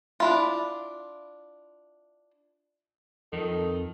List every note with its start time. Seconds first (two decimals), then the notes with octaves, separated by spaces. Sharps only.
0.20 D4 E4 F4
3.33 F2 D#3 A4